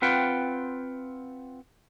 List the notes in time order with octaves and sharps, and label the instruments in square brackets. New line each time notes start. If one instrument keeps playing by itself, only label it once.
[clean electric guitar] C4 F4 B4 F#5 G5